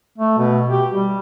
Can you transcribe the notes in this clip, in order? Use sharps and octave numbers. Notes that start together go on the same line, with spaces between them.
A3
B2
G4
G3